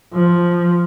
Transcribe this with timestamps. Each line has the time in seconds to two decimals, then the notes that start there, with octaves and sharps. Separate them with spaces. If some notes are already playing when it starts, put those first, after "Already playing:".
0.14 F3